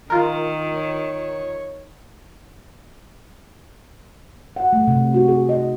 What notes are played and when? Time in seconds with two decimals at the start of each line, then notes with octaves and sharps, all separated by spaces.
0.10 D#3 F4 A#4
0.75 C#5
4.56 F#5
4.73 A3
4.87 C3
5.14 F#4
5.28 G#4
5.49 D#5